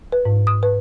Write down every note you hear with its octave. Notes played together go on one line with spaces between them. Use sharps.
B4
G#2
D#6
B4